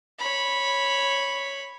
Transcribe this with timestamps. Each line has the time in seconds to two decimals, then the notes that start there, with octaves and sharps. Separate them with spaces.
0.19 C#5 B5